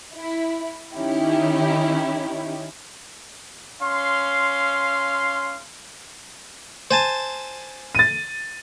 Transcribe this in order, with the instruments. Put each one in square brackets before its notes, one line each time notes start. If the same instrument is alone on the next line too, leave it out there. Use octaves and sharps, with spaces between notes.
[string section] E4
D#3 C#4 D#4 E4 G4
[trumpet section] C#4 F5 C6
[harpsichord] C5 G#5 A5
[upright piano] A6 D#7